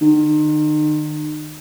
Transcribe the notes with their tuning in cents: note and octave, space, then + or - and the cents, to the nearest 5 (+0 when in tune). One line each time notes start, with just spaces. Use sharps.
D#3 -40